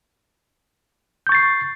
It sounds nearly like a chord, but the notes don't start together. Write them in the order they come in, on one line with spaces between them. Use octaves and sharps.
G6 C#6 A6 C7